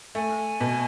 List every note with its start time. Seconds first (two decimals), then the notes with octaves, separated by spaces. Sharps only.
0.15 A3 G#5
0.61 B2